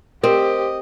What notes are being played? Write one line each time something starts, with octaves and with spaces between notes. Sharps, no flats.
C4 G4 A#4 D#5